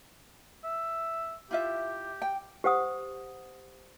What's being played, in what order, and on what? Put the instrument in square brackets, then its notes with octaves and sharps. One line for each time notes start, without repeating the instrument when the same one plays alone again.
[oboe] E5
[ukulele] E4 F4 E5 [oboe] G4
[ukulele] G5
[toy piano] G4 C5 F#5 D#6